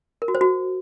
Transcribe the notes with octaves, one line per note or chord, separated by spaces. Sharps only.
A#4
F#4
C5
F#4